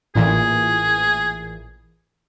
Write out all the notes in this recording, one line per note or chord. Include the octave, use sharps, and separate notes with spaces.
A1 A#2 E3 G#4